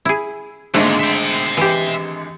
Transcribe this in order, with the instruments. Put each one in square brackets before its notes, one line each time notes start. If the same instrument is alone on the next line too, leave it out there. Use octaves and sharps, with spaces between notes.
[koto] E4 G#4
[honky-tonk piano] G#1 D3 G#3 [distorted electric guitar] A#2 [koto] A3
[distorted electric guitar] E5 G5
[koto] E3 G4